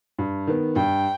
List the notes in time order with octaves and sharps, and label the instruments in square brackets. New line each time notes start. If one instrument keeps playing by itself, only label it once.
[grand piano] G2
D#3 B3
[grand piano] G2 [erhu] G5